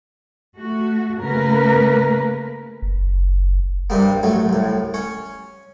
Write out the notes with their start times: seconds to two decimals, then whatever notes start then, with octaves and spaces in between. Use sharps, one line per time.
0.57 A3 F#4
1.21 C#3 A3 A#3 A#4 B4
2.82 F#1
3.90 G2 C3 G3 A#3
4.23 A1 F#3 A3
4.49 C2 A2
4.94 C#4 C#5